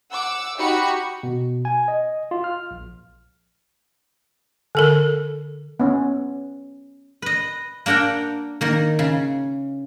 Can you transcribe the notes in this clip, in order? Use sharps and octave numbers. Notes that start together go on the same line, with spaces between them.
F#5 D6 E6
D#4 F#4 G4 B5 C#7
B2
G#5
D#5
F4
F6
A#1
D3 A4 A#4
B3 C#4
B4 D#5
A#3 D4 A#4 F#5 G5
D#3 A#3
C#3